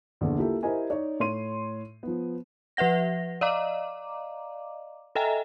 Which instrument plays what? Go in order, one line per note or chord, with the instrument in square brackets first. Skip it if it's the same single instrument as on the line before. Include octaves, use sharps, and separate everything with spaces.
[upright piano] A#1 E2 D3
A#3 E4 F4 G4 A4
E4 G4 A#4 C5 D#5 G#5
D#4 C#5 D5
A2 C#5 C6 D#7
F3 B3
[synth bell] F3 B4 E5 F#5 A#6
D5 D#5 F5 A#5 D6
A4 D#5 E5 G5 G#5 A#5